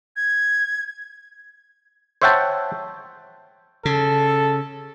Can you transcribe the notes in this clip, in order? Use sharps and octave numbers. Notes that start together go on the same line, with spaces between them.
G#6
C5 C#5 E5 F#5 G5 A5
C#3 A4